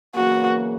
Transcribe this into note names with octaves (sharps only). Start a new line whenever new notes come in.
E2 C#3 F#3 A#3 F#4